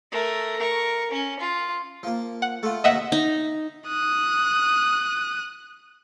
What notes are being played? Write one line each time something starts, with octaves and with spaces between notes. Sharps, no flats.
A3 A#4
A#4 C#6
C#4
F4
F3 A#3
F#5
A3 F4
D#2 C3 D#3 D#5 E5 F#5
D#4
D#6 F#6